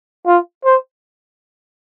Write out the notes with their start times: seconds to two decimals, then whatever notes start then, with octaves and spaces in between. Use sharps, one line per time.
0.26 F4
0.65 C5